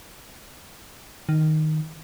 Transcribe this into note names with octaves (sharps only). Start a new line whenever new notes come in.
D#3